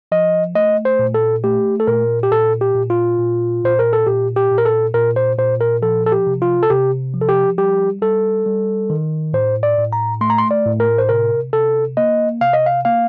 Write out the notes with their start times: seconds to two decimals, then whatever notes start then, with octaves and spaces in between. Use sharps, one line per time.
0.12 F3 D#5
0.55 A3 D#5
0.85 C5
0.99 A#2
1.14 A4
1.44 A3 G4
1.80 A4
1.87 A#2 A#4
2.23 G4
2.31 A#2 A4
2.61 G4
2.75 A#2
2.90 F4
3.19 A#2
3.64 A#2 C5
3.79 A#4
3.93 A4
4.06 A#2 G4
4.36 G4
4.51 A#2
4.58 A#4
4.65 A4
4.94 A#2 A#4
5.16 C5
5.38 A#2 C5
5.61 A#4
5.82 F3 A4
6.06 A4
6.12 G4
6.27 C3
6.42 F4
6.63 A4
6.70 C3 G4
7.14 F3
7.21 A4
7.29 G4
7.58 G3 G4
8.02 G3 A4
8.46 G3
8.90 D#3
9.33 A2 C5
9.63 D5
9.78 A2
9.93 A#5
10.21 A3 C6
10.30 A#5
10.38 C6
10.51 D5
10.66 A2
10.80 A#4
10.98 C5
11.09 C3 A#4
11.53 C3 A4
11.97 A#3 D#5
12.41 C3 F5
12.53 D#5
12.66 F5
12.85 A#3 F5